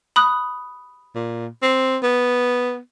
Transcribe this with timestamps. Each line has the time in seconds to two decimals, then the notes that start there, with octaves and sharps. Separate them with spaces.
0.16 B5 D#6 F#6
1.15 A#2
1.62 C4
2.03 B3